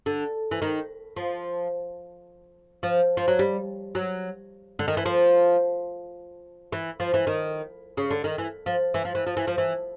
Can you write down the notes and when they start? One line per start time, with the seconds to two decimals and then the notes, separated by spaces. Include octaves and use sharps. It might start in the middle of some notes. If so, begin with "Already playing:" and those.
0.06 D3
0.51 E3
0.62 D#3
1.16 F3
2.83 F3
3.17 F3
3.28 F#3
3.39 G3
3.95 F#3
4.79 D3
4.88 D#3
4.97 E3
5.06 F3
6.72 E3
7.00 F3
7.14 E3
7.27 D#3
7.97 C#3
8.10 D3
8.24 D#3
8.38 E3
8.66 F3
8.94 E3
9.05 F3
9.15 E3
9.27 F3
9.37 E3
9.47 F3
9.58 E3